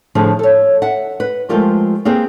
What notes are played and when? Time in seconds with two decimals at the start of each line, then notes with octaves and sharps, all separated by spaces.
0.15 A2 D3 F3 E4 G#4
0.39 A4 C#5
0.82 E5 F#5
1.20 B4
1.49 F3 G#3 A3 F4 G4 A#4
2.05 A#3 C4 G4 G#4 B4